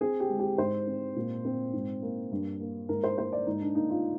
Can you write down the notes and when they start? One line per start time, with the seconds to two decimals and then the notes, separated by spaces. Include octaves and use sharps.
0.01 C4 G#4
0.20 G4
0.30 G#3
0.39 G4
0.58 G#2 C5
0.87 C4
1.16 A#2
1.45 C4
1.73 G#2
2.02 A#3
2.31 G2
2.60 A#3
2.89 G#2 A#4
3.04 C5
3.17 A#3 C5
3.33 D5
3.47 G#2 D#4
3.61 D4
3.75 A#3 D#4
3.89 F4